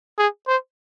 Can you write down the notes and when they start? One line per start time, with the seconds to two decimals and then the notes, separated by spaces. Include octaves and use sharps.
0.18 G#4
0.48 C5